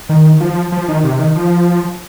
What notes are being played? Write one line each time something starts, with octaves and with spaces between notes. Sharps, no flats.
D#3
F3
F3
D#3
C3
D#3
F3